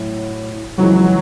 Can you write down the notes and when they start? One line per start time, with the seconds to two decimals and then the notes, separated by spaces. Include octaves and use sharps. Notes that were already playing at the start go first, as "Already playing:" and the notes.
Already playing: A2 F#3
0.78 F2 C#3 E3 F#3 G#3